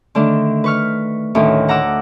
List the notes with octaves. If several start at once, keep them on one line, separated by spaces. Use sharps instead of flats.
D3 D#3 A3 D4
B4 C#6 F6
D2 A2 D#3 C#4
F#5 A#5 D6 E6